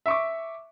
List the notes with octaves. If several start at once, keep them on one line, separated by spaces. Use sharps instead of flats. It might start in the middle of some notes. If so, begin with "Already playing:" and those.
E5 C#6 D6